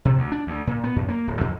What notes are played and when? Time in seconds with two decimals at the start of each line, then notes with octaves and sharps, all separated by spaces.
0.05 C3
0.18 D2
0.32 D4
0.47 D2
0.67 A#2
0.84 B3
0.96 F#2
1.09 A#3
1.27 D1
1.41 F2